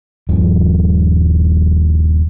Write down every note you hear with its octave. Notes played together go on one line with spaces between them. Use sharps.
D#1 G2 F3